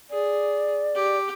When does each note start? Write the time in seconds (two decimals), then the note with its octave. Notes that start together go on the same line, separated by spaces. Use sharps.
0.11 G#4 D5
0.95 G4